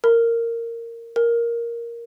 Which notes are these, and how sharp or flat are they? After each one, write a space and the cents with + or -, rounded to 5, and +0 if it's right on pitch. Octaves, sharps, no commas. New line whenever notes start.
A#4 -15
A#4 +5